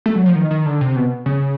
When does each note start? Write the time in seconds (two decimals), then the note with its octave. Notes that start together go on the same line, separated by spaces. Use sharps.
0.06 A3
0.15 F#3
0.26 F3
0.35 D#3
0.51 D#3
0.66 D3
0.81 C3
0.96 B2
1.26 C#3